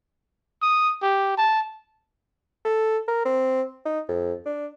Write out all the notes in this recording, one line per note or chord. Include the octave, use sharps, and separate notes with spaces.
D#6
G4
A5
A4
A#4
C4
D#4
F2
D4